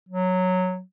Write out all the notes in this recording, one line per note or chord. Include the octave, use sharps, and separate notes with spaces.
F#3